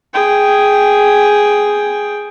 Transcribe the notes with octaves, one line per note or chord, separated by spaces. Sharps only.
G#4 G5